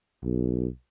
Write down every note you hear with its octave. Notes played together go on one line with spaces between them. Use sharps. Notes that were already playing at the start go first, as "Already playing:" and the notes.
B1